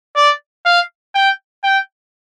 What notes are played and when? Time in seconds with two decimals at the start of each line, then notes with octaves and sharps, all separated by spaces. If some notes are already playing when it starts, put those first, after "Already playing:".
0.16 D5
0.66 F5
1.15 G5
1.64 G5